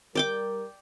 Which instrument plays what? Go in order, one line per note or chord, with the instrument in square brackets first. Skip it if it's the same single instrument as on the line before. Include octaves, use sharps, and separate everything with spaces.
[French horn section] G3 A#4 [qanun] D5 G5 D6